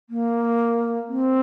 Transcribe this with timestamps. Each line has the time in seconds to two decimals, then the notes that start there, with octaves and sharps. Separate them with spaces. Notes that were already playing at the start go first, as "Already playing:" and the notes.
0.09 A#3
1.08 C4